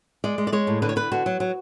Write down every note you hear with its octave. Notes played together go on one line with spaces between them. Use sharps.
G#3 D5
G#3
D5
G#3 C#5
A2
D3 B4
C#5
D3 B4
D3 F#4
F#3
F#3